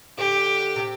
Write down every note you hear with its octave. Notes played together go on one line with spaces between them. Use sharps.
D3 G4
C3